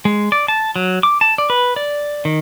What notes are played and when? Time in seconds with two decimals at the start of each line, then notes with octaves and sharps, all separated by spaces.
0.05 G#3
0.32 D5
0.48 A5
0.76 F#3
1.03 D6
1.21 A5
1.38 D5
1.50 B4
1.76 D5
2.25 D#3